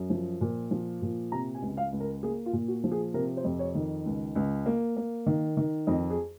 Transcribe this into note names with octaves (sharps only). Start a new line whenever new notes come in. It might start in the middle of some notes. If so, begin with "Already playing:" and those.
Already playing: F#2
F3
A#2
F3
A#2
C3 A#5
G#5
C#2
F5
C#2
A#4
A#3 G#4
F4
A#2
F#4
F3
G#4
C3 A#4
C5
F2
C#5
D#3
C#2
C#2
A#3
A#3
D#3
D#3
F2 D#4
G#4